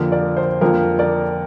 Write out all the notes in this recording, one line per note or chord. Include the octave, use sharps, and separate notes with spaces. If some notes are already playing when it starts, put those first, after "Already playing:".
Already playing: F2 D3 F3 A#3 A#4
A#4 D5
C5
F2 D3 F3 A#3 A#4
A#4 D5